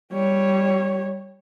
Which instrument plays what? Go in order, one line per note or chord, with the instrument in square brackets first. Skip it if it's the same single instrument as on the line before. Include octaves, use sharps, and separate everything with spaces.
[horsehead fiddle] G3 C#5